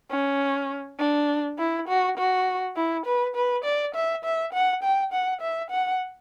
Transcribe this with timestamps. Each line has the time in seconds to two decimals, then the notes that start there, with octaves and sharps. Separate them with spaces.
0.11 C#4
0.99 D4
1.59 E4
1.88 F#4
2.18 F#4
2.76 E4
3.06 B4
3.36 B4
3.65 D5
3.95 E5
4.25 E5
4.53 F#5
4.83 G5
5.13 F#5
5.42 E5
5.71 F#5